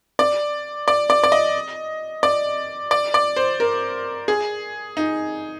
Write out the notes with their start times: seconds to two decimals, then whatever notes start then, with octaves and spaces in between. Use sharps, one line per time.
0.19 D5
0.88 D5
1.10 D5
1.24 D5
1.32 D#5
2.23 D5
2.91 D5
3.14 D5
3.36 C5
3.60 A#4
4.28 G#4
4.97 D#4